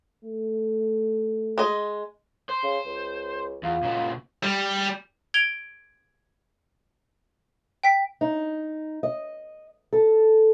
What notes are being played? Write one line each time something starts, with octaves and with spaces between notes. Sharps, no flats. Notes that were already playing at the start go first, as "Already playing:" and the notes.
A3
G#3 D#5
C5
C#3
C#2
E2 F4
A#2 C#3 F#4
G3
G#6 D7 F7 G7
G5 B6
D#4
D#5
A4